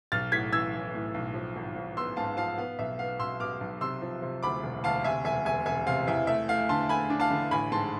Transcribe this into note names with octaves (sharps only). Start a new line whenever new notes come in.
B1 F6 A6
A2 G#6 B6
E3 E6 G#6
E3
A2
B1
F3
G#1
G#1
B3 C6 E6
G#2 F5 A5
F3 F5 A5
B3 F5
B1 E5
B3 F5
B2 C6 E6
B2 D6 F6
B1
C3 C6 E6
F3
C3
D2 B5 D6
E1
D2 F5 A5
C3 E5 G#5
E1 E5 G#5
E1 E5 G#5
E1 E5 G#5
C3 F5
E2 E5
A3 E5
A3 F5
D3 A5 C6
A3 G#5 B5
D4
F5 A5
D3
A1 G#5 B5
G#2 A5 C6